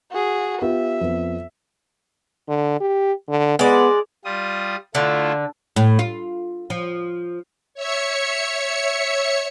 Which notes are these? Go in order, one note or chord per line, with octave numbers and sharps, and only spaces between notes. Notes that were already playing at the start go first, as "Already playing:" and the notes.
F#4 G#4
B3 F4 G4 E5
F2 B3
D3
G4
D3
G#3 B3 D5
G3 F4 D#6
D3 A3 E4 F4
A2
F4
F3
C#5 E5 C#7